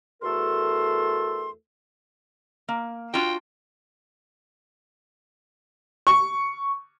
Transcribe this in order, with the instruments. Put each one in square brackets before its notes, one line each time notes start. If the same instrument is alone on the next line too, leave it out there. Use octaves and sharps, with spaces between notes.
[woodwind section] E2 A3 F#4 A4 A#4 C6
[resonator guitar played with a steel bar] A#3
[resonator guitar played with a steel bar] D4 F4 F#4 [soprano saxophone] G5
[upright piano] C#6